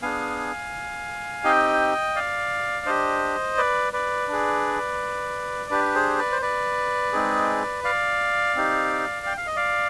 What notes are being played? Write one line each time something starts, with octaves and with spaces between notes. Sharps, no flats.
B3 D4 G#4 F5 G#5
C4 D#4 G4 D#5 G5
D5 F5
D4 G4 C5 D#5
B4 D5
B4 D5
D4 G#4
D4 G4 B4
G#4 C5
B4 D5
C5
B4 D5
G#3 C4 D#4 G#4
D5 F5
C4 D#4 G4
G5
F5
D#5
D5 F5